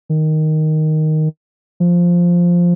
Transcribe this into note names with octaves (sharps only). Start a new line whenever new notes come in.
D#3
F3